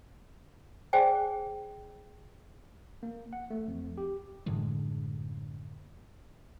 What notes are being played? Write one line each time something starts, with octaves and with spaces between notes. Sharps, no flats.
G#4 C5 D5 G5 G#5
A#3
F#5
A3
F2
G4
F#2 A2 D3 G#3